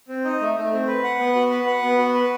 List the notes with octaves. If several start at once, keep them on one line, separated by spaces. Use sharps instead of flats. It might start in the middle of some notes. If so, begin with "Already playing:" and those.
C4
D#4
A3
A3
C4
B4
F#5
B3
F#4
B4
F#5
B3
F#4
B4